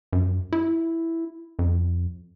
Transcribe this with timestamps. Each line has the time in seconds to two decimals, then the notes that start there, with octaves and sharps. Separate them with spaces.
0.13 F#2
0.53 E4
1.59 F2